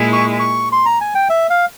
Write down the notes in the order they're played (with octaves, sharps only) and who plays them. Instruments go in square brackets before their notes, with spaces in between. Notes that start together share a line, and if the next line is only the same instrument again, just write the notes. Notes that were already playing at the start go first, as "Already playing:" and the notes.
Already playing: [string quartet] A#2 G#3 E4
[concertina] C#6
C#6
C6
A#5
G#5
G5
E5
F5